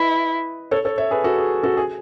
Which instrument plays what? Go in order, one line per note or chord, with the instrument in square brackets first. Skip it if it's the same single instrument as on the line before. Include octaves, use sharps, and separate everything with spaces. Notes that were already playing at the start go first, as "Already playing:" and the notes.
Already playing: [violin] E4 [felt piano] B4 D#5
[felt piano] A4 C#5
A4 C#5
C#5 E5
G#4 B4
F#4 A4
G#4
F#4 A4
G#4